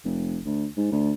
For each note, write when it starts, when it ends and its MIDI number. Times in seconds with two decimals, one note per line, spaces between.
0.05 0.38 29
0.45 0.66 38
0.77 0.88 44
0.92 1.12 38